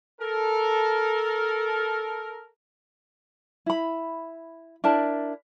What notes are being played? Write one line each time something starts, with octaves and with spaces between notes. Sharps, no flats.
A4 A#4
E4 B5
D4 E4 A#4 A5